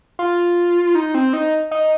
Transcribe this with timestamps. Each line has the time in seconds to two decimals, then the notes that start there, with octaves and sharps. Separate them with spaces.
0.19 F4
0.95 D#4
1.14 C4
1.33 D#4
1.71 D#4